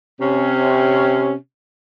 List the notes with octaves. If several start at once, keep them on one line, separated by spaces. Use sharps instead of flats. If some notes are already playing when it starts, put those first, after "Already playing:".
C3 C#4